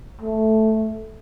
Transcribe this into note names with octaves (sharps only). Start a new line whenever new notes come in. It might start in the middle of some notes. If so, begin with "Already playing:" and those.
A3